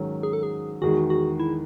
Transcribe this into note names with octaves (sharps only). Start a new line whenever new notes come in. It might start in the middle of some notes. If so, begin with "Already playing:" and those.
Already playing: G#2 D#3 F#3 C#4
G#4
A4
G#4
E2 D#3 G#3 F#4
F#4
E4